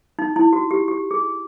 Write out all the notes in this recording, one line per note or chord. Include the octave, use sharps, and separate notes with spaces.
D#4
E4
F#4
G4
G4
G#4